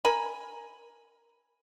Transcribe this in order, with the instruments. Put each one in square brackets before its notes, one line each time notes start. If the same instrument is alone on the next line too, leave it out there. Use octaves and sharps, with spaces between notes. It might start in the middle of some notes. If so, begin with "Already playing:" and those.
[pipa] A#4 G#5 B5